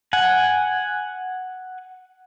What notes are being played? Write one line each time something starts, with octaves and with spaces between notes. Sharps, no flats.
F#5 G#5